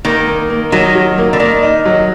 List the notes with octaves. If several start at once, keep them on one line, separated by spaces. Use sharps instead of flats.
D#3 A#3
A#3
A#3
D#3 F#3
F#3
A#3
D3
D#3 A#3
D#4
F#3